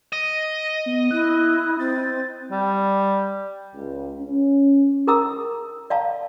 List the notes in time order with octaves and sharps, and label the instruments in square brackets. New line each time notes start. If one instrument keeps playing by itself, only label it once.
[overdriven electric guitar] D#5
[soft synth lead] B3
[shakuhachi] E4 [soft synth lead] F#6
[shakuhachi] C4 [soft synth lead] A6
[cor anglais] G3
[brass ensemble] C#2
C#4
[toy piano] G#4 A#4 A5 A#5 D#6 E6
D5 F5 A5 A#5